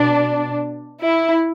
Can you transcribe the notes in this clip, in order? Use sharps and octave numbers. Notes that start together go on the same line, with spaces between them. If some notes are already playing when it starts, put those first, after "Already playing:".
Already playing: B2 D4
E4